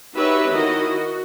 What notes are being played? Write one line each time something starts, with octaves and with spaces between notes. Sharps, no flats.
D#4 F#4 G4 B4 C#5 E5
D#3 E4 F#4 D#5
F#4